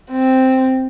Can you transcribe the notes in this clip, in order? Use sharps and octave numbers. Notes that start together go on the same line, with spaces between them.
C4